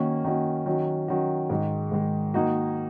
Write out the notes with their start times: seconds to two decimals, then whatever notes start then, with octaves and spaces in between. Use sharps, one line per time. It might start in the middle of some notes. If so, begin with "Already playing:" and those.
Already playing: D#3 A#3 C#4 F#4
0.24 D#3 A#3 C#4 F#4
0.66 D#3 F#3 C#4 F#4
1.08 D#3 F#3 C#4 F#4
1.50 G#2 D#3 G#3
1.92 G#2 D#3 G#3
2.34 D#3 A#3 D#4 F#4